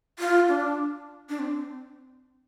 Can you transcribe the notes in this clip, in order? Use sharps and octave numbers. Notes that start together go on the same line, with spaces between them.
F4
D4
D4
C4